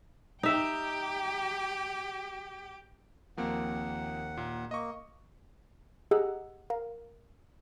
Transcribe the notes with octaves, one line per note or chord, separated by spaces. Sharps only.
D#4 G4 E5 G5
D#2 F3 A#3 C4 F#5
A#2
A#3 D#5 C#6
G4 G#4 D#5 F#5 A#5 E6
A#4 F5